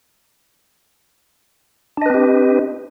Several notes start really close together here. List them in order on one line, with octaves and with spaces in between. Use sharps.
D4 D#5 B4 C4 G4